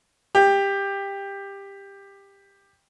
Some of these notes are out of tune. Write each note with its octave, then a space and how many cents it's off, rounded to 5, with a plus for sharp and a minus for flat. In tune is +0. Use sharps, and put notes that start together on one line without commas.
G4 +15